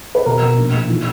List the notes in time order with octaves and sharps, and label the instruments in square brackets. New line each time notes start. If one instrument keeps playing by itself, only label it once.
[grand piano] B4
B2 A#4
B2
A#1
A#1
E3